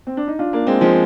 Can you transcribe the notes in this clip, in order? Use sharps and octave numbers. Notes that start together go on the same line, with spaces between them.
C4
D4
D#4
D4 F4
A#3 D4
G#3 C4
F3 G#3